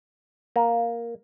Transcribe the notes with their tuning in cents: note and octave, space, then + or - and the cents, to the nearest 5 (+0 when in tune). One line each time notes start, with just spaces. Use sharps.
A#3 +5